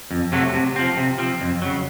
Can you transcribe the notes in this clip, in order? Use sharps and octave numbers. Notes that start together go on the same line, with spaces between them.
F2
C3 F#3 A3
C3
F3 C4
C3
F3 C4
F2
C#3 F#3